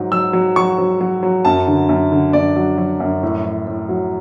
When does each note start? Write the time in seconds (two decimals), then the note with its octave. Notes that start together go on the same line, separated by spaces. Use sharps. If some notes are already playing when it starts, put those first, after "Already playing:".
Already playing: G#2 F#3
0.12 F#3 E6
0.33 F#3
0.56 F#3 C#6
0.78 F#3
1.01 F#3
1.23 F#3
1.45 F#2 A5
1.67 D3
1.89 F#2
2.12 D3
2.33 F#2 D5
2.56 F#3
2.78 F#3
3.00 F#2
3.23 A2
3.45 A2
3.67 A2
3.89 F#3